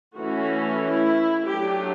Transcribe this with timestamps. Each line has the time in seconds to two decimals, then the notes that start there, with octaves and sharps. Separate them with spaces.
0.16 E3 A3 C#4 E4 F#4
0.81 E4
1.47 F#3 A3 D4 G4